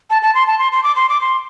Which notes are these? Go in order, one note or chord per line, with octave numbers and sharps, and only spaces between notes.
A5
A5
C6
A5
C6
C6
D6
C6
D6
C6